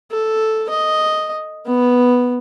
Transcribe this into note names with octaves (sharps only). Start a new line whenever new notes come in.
A4
D#5
B3